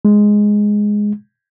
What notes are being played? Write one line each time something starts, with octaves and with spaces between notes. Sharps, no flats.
G#3